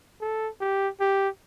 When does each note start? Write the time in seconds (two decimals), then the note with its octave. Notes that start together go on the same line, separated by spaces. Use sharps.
0.21 A4
0.60 G4
1.00 G4